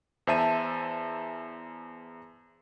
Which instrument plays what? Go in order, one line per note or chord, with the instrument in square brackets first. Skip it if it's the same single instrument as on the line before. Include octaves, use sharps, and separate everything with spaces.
[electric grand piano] E2 C5 E5 A5 D#7